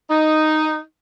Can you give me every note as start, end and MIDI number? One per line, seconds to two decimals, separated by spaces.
0.10 0.79 63